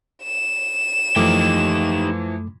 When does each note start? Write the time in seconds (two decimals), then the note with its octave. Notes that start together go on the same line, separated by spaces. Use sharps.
0.23 E7
1.16 F#2 E3 F3 A3 D#4 G4 G5 D6